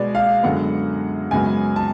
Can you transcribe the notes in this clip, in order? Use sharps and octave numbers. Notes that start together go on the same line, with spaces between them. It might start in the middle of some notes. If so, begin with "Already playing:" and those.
Already playing: B2 G#3 B3 D5
F5
F#2 D3 G#3 B3 F#5
F#2 C#3 G#3 B3 G#5
A5